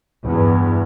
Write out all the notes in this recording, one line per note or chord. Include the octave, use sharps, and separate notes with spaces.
E2 G2